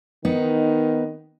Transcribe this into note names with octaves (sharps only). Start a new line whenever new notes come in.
D#3 B3 D#4